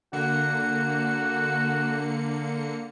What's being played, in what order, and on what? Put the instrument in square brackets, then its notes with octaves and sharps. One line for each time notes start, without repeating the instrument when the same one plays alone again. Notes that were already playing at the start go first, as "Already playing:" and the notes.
[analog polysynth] D3 A#3 C#7 [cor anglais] F#4